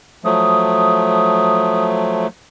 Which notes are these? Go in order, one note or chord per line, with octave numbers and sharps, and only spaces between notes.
F3 F#3 A3 D#6